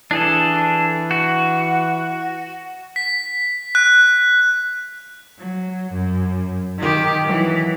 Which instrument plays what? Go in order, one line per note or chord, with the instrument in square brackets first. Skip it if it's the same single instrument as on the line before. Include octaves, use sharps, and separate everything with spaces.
[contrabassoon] E3 [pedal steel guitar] D4 G#4 A4
[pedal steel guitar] F#4
[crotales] B6
F#6
[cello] F#3
F#2
D#3 G4
E3 F#3